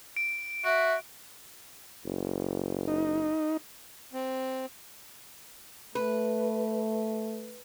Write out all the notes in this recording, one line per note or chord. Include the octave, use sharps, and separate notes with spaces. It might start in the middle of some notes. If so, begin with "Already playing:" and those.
D7
F#4 E5 D7
F#1
D#4
C4
A3 B4